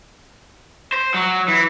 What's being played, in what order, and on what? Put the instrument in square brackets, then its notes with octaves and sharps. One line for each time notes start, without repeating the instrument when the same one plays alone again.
[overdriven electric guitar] C5
F#3
E3